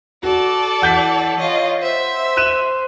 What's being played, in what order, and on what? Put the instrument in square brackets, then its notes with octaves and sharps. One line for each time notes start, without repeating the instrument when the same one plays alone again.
[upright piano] F#4 [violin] A4 D5
[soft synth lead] E3 [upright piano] F#5 G6 B6
[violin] F4 D#5 [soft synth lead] C#5
[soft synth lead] C5 [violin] E5
[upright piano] F#6 D#7 E7